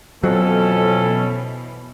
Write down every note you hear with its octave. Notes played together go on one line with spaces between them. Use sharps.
F2 B2 E3 F#3 C#4 A4